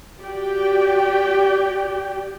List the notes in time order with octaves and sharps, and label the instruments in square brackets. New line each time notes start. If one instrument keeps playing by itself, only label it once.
[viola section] F#4 G4 D5 G5